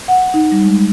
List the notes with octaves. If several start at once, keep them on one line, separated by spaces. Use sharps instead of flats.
F#5
D#4
G3
G#3